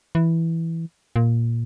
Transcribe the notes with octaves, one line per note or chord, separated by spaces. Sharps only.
E3
A#2